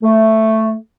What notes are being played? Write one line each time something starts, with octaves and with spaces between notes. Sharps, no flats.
A3